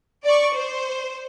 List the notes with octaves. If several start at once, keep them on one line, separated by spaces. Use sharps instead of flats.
D5 C#6
C5